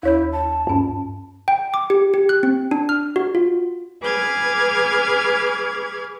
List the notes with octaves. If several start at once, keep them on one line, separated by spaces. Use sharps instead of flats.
D#2 E4 C#5 G6
A5
G2 C#4
G5
D6
G4
G4
F#6
C4
D4
F6
F#4
F4
G#4 B4 D6 F6 G#6